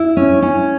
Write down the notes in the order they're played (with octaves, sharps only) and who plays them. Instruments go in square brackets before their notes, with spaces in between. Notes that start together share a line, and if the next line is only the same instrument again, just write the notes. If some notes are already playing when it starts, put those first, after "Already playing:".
Already playing: [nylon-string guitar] E4
C#4
C#4